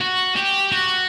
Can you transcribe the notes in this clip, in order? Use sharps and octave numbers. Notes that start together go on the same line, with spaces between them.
F#4
G4
F#4